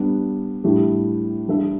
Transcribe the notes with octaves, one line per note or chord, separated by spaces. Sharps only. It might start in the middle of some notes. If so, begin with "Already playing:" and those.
Already playing: G3 B3 D4
A2 G3 D4 G4
G3 D4 A4 E5